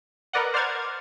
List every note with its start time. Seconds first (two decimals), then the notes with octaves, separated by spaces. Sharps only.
0.33 A#4 B4 D5 D#5 F#5
0.54 C5 D5 F#5 F6 G#6 A6